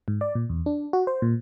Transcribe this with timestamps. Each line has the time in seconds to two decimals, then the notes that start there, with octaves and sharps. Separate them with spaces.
0.08 G#2
0.21 D5
0.35 A#2
0.49 E2
0.66 D4
0.93 F#4
1.07 C5
1.22 A#2